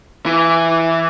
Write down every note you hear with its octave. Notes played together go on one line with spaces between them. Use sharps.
E3